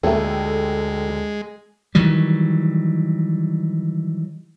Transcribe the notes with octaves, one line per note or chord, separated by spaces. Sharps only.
D2 A#2 G#3 A3 G4 A4
D#3 E3 F#3 G3